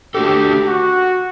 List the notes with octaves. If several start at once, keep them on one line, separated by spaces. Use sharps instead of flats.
A3 D4 F#4 G4 A4
F#4